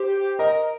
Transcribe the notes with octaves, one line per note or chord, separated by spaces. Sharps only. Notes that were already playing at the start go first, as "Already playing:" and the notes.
Already playing: G4 C5
A#4 D#5